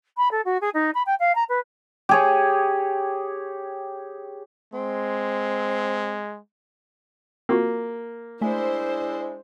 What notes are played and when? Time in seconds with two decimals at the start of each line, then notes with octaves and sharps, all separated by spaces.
0.17 B5
0.31 A4
0.45 F#4
0.61 G#4
0.74 D#4
0.94 B5
1.06 G5
1.20 F5
1.35 A#5
1.49 B4
2.09 G4 G#4 C#5
4.74 G#3 C4
7.49 A#3 C4 F4 F#4
8.41 G#3 A3 D4 E4 C5 E5 G#5